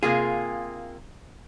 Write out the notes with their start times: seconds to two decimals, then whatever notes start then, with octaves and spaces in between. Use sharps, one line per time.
0.03 C3 A#3 F4 G#4